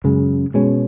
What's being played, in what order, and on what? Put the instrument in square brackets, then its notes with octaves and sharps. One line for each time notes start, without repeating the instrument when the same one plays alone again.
[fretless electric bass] F#2 C#3 G#3
B2 G#3 C#4